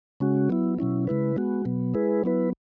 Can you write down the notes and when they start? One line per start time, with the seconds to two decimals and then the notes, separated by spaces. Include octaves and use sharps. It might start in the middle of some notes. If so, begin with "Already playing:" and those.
0.20 C#3 G#3 C#4 F#4
0.50 F#3 B3 E4
0.79 B2 F#3 C#4 E4
1.07 C#3 G#3 E4 B4
1.36 G#3 B3 F#4
1.65 B2 F#3 B3
1.94 G#3 E4 G#4 B4
2.24 F#3 B3 E4 B4